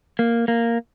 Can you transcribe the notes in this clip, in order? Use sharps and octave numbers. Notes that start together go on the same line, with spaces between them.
A#3
A#3